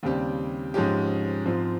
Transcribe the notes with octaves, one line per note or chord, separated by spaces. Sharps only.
D#2 C#3 G3 C4 G4
G#2 F3 G#3 C#4 G4
G#2 F3 C4 F4